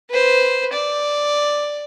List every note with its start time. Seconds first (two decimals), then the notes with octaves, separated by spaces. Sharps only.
0.10 B4 C5
0.73 D5